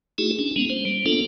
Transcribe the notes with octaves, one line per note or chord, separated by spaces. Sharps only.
A3 D#4 E4 F#4 G#4
C#4 D4
G#3 A#3 B3 C#4
C5
G3
A#3 B3 D4 F4 A4